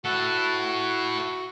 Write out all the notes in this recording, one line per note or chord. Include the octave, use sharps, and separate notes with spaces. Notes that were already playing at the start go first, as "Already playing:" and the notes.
E4 F#4 A4 F#5